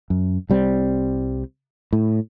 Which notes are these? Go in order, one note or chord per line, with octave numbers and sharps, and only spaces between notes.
F#2
C2 G3 C4
A2